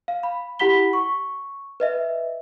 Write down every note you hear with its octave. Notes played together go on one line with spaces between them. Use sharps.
F5
B5
E4 G4 F#5 B5 B6 G7
C#6
B4 D#5 E5